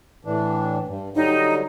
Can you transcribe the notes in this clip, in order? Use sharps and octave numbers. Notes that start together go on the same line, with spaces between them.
A2 E3 D4
G2
D3 F#3 G3 D#4